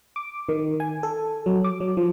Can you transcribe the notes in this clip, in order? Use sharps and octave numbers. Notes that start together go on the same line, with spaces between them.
D6
D#3
G#5
A4
F#3
D6
F#3
F3